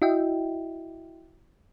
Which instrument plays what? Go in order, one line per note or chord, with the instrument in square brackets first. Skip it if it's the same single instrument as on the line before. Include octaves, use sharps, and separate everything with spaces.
[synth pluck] E4 F#4 D#5 E5 G5